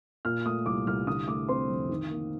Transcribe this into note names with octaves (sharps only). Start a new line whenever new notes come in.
A#2 F6
A3 D#6
C2 D6
C2 F6
D3 D#6
A3 D6
C4 C6
F2
D#3
A#3